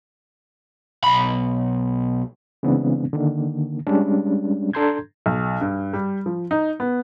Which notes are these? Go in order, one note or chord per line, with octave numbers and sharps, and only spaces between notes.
B1 B5
C#3 E3 G#3 B3 C4 D4
D3 D#3 A#3
G3 G#3 C#4 D4
D4 A4 A#5 C6 G6 G#6
B1
G2
G3
F3
D#4
B3